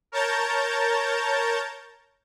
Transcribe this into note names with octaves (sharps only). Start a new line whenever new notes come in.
A#4 C#5 A5 A#5 G6 A6